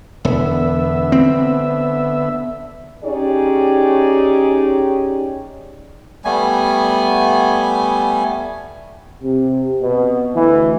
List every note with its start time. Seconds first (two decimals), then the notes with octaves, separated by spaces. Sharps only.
0.25 E1 D3 B3 E5
1.12 C4
3.04 C#4 D#4 G4 G#4 C#5 D5
6.25 G3 A3 B3 G#5
9.22 C3
9.82 B2
10.34 D2 E3